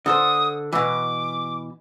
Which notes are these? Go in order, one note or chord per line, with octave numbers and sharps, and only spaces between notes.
D3 A4 C5 D#6
B2 E3 D6